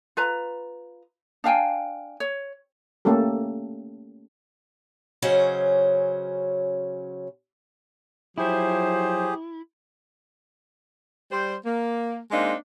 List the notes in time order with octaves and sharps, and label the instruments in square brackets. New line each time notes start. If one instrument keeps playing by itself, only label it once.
[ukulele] F4 B4 A#5
D4 F5 G5 G#5
C#5
[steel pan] A3 A#3 C#4 G4 A4
[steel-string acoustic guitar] C#3 F#3 C#4 C5 D#5
[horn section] F3 F#3 C5 [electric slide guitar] E4 [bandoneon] G4 G#4
[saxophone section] G3 C5
A#3
G#3 A#3 C4 D4 D#4